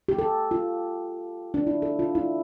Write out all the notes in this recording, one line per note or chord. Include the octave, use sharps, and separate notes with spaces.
G4
A4
F4
D4
E4
A4
F4
E4